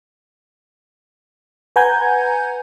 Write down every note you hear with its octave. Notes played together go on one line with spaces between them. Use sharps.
B4 F#5 G#5 A#5 G6 G#6